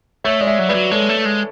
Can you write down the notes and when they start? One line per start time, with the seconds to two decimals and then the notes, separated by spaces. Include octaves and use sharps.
0.24 A3 C#5 E5
0.41 G#3 D5
0.47 C#5 E5
0.59 F#3
0.69 G#3 B4 D5
0.74 F#3
0.91 G#3 A4 C#5
1.09 A3
1.26 G#3